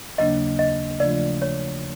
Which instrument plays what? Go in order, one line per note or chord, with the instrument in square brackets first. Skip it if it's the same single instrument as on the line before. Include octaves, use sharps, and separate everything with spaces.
[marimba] D#2 C#3 F#3 A#3 D4 [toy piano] D#5
[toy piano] D#5
[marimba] C#3 F3 A3 D4 F4 [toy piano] D5
[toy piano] C#5